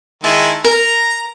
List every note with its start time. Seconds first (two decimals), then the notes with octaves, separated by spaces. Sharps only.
0.24 D#3 G#3 E4 A5
0.64 A#4 A#5